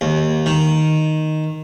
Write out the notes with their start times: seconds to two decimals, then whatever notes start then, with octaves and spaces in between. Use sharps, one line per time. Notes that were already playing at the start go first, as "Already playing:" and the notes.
0.01 D#2
0.46 D#3